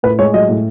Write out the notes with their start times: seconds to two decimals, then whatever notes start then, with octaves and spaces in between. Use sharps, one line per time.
0.03 A2 B4
0.19 G#3 C#5
0.34 F#3 D#5
0.49 A2